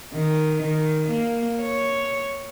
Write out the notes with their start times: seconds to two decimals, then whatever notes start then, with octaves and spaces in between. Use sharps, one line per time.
0.14 D#3
0.62 D#3
1.10 A#3
1.61 C#5